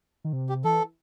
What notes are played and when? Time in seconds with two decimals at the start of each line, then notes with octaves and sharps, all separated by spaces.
0.24 D#3
0.33 C3
0.49 G4
0.64 E3 A4